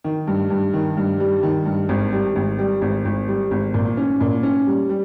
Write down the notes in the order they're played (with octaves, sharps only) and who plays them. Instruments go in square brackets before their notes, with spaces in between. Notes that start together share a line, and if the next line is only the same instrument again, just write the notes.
[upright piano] D#3
G2
G2
D#3
G2
G3
D#3
G2
G#1
G3
G#1
G3
G#1
G#1
G3
G#1
A#2
C#4
A#2
C#4
G3
G3